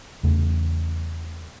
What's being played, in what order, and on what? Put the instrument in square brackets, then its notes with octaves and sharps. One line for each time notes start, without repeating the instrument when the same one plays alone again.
[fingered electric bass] E2 C#3 A3